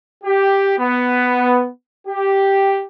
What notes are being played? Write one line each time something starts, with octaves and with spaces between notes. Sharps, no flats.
G4
B3
G4